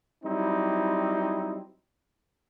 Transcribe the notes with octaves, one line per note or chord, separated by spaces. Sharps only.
F#3 G3 C4 D#4 E4